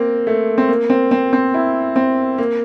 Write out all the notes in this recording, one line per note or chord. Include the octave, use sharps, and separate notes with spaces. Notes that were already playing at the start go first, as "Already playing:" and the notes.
Already playing: A#3 C4
A3
C4
A#3
C4
C4
C4
E4
C4
A#3